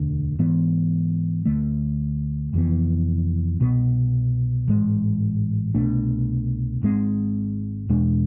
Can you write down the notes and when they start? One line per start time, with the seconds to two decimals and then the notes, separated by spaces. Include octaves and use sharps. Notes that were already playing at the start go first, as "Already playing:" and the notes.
Already playing: E1 D2 D3
0.39 G#2 E3 B3
1.45 D2 D3 A3
2.53 F1 F2 E3 B3
3.60 C2 B2 B3
4.68 A1 G#2 G#3
5.74 C2 B2 A3 D4
6.81 G#1 G#2 G#3 C4
7.89 E2 B2 G#3 D4